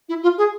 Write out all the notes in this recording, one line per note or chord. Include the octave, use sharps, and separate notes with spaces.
E4
F4
G#4